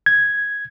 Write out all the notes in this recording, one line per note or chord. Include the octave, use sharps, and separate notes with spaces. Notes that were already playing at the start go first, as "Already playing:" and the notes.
G#6